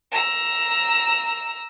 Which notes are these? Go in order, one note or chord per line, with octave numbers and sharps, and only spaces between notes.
A#5 E6